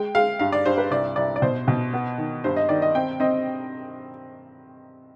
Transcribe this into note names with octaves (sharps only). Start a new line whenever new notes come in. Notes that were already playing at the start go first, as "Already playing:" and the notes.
Already playing: G#3 G5
G#3 F5
G2 F5
D5
G2 C5
B4
C2 D5
C2 D5
D5
B2 C5
B2
B3
D#3
G2 C5
D#5
D#3 D5
D#5
C4 G5
C4 D#5